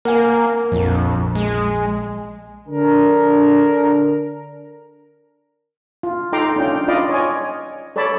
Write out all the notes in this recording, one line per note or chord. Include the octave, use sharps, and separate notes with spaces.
A#3 A#4 F#5 G#5
A#1 F2
G#3
D3 D4 A#4
F4
D#4 A4 G5 A#5 C6 D6
C#4 D4 F4 G5
F4 D5 D#5 F5 B5 D6
C#5 D#5 G#5
A4 C#5 D5 A5 B5